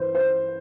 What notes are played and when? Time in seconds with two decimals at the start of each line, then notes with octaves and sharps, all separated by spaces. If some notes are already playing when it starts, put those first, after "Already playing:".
Already playing: G2 E3 B4 C5
0.15 C5